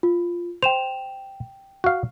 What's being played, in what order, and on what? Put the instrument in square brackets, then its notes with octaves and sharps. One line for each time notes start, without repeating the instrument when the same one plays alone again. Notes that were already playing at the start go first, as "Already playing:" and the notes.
[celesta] F4
[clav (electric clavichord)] C5 [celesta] G5 E7 F7
[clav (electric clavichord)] F#4 F5